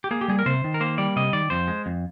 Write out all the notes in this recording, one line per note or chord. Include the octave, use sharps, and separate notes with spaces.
G4
A#3 G#4
G4
G3 G#4
A#4
C3 C5
D#3
A#4
A#3 C5
G3 D5
C3 D#5
D#3 D5
F2 C5
G#3
F2